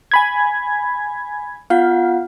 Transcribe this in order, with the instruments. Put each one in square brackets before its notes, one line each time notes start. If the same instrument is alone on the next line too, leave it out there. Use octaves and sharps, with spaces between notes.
[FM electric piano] G#5 B5 G#6
[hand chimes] B3 F4 F#5 [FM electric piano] F5